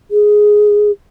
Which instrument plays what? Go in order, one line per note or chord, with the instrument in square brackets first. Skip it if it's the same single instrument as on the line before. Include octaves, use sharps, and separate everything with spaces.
[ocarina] G#4